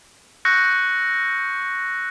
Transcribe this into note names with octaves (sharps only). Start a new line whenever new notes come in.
C#6 E6 F#6 G6 A#6 C#7